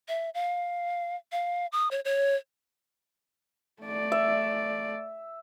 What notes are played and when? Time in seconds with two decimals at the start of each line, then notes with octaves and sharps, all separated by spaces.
0.08 E5
0.34 F5
1.32 F5
1.72 D#6
1.91 C#5
2.05 C#5
3.83 A3 D5
4.12 E5